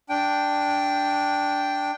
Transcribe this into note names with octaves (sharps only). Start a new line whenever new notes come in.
D4 G5